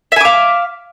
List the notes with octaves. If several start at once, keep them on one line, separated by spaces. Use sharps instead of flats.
E5 F5 G#5 D6